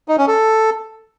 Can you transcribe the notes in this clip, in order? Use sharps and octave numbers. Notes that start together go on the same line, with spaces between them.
D#4
C#4
A4